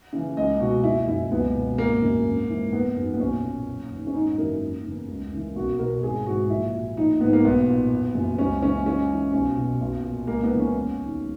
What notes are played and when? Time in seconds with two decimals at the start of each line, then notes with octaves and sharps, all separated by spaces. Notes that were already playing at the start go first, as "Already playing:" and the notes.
0.13 C#3 E3
0.37 C#2 D#5
0.60 B2 F#4
0.84 F#1 E4
1.07 F#2 E3 E4
1.31 C#2 B3
1.55 B2
1.78 G#1 A#3
2.02 F#2 C#3 E3
2.25 G#1
2.49 G#2 E3
2.73 F#1 B3
2.96 F#2 D#3
3.14 B3
3.20 B1 C#4
3.44 A#2
3.67 F#1
3.91 E2 D#3
4.07 C#4
4.14 G#1 D#4
4.38 F#2 C#3 E3 A#4
4.62 F#1
4.85 E2 C#3
5.08 C#2
5.32 C#3 E3
5.55 B1 F#4
5.79 B2 A#4
6.03 G#1 G#4
6.26 G#2 E3 F#4
6.50 A#1 E4
6.74 A#2
6.97 A#1 D#4
7.21 G#2 D#3 B3
7.33 A#3
7.44 B1 B3
7.68 A#2
7.92 F#1
8.15 F#2 E3
8.39 C#2 C#4
8.62 C#3 E3 C#4
8.86 C#2 C#4
9.09 C#3 E3
9.33 B1 C#4
9.57 B2
9.80 B1
10.04 A#2
10.27 C#2 A#3
10.43 B3
10.50 C#3 E3
10.59 C#4
10.75 E1
10.98 D#2 D#3